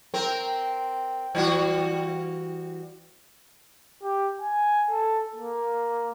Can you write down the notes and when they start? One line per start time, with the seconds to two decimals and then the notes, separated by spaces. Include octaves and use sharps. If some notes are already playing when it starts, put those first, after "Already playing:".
0.14 C4 A#4
1.35 E3 G3 F#4
4.03 G4
4.42 G#5
4.90 A4
5.35 A#3